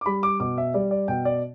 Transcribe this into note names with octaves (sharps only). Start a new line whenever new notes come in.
D6
G3 B5
D6
B2 D6
E5
G3 D5
D5
B2 G5
D5